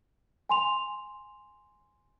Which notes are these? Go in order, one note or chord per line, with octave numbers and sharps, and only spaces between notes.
G#5 C6 F7